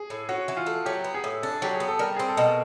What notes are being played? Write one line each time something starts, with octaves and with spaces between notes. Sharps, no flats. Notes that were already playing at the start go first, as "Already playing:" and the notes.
Already playing: G#4
A2
C#4 F#4
E3
F4
A3
F#3 G4
B3
G#4
A2
D4 A4
F#3 G4
B3 G#4
A4
G3 A#4
C4 G#4
A4
B2